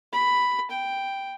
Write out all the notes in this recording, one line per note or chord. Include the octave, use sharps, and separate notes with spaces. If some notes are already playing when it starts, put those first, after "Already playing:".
B5
G5